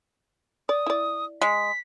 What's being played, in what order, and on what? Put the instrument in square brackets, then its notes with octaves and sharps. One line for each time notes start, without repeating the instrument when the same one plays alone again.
[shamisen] D5 [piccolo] D#6
[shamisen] E4 D5
[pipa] G#3 [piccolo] B6